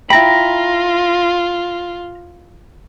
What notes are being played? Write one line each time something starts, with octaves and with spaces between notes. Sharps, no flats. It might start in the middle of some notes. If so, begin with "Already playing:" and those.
E4 F4 G5 A#5 B5